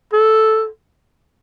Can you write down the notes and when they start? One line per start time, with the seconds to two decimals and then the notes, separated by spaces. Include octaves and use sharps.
0.13 A4